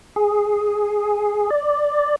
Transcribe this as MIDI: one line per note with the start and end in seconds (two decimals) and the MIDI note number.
0.16 1.50 68
1.50 2.16 74